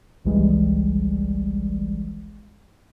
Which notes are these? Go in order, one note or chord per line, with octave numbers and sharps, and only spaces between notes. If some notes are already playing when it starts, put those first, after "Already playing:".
G#1 C#2 E3 G3 G#3